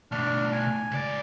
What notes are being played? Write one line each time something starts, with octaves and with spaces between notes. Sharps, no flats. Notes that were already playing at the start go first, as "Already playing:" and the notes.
B2 A3 D4 F6
G#5
C#2 D5